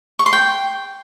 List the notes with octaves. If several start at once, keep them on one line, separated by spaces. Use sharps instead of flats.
C#6
C6
G5